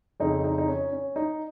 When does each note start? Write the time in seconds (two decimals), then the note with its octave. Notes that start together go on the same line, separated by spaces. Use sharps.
0.20 F2 C#3 D#4
0.44 D#4
0.58 D#4
0.68 C#4
0.92 C#4
1.16 D#4